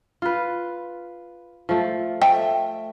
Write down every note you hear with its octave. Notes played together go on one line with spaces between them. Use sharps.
F4 B4
F3 A3
A3 C5 E5 G5